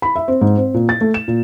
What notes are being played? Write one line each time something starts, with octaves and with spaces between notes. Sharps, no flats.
B5
E5
C4
G#2
C4
A#2
A6
A3
E7
A#2